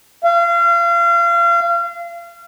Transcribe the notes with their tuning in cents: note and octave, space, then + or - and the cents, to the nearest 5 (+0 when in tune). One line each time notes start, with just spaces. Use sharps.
F5 -35